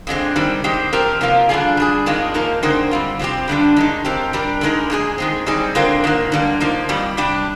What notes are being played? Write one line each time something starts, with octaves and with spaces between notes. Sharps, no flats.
F2 D3 G#3 C4
D#3 G3 C4
D#3 G#3 C4 G4
F3 C4 G4 A#4
C3 F3 A#3 F4 A#4
D3 G3 D4 F4 G#4
G3 D4 G#4
F2 D#3 G#3 D4 F4
F3 A#3 D#4 A#4
D3 G#3 C4 D#4 A#4
G3 C4 F4
C3 F3 G#3 C4 G4
G2 D3 G3 D4
D#3 G#3 D#4
F3 C4 G4 A#4
G3 D4 G4 A#4
D3 G#3 D#4 A#4
A#2 G#3 D#4 G#4
D#3 G#3 C4
G3 C4 D#4 G#4
D3 G#3 C4 F4 A#4
G#2 D#3 A#3
D3 G3 A#3
F3 A#3 D#4
F2 D#3 G3
C3 G3 D4 G4